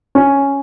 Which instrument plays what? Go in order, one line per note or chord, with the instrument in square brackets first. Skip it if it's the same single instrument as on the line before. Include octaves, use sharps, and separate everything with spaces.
[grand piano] C#4